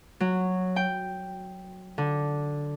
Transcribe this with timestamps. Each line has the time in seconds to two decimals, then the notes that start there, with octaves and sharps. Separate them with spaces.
0.20 F#3
0.76 G5
1.98 D3